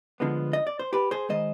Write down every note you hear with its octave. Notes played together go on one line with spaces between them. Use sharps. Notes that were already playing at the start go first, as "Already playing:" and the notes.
D2 D3 F3 G#3 B3
D#5
D5
C5
G4 B4
G#4 C5
D#3 G#3 C5 D#5